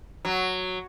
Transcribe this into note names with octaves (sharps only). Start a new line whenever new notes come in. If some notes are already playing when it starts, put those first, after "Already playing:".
F#3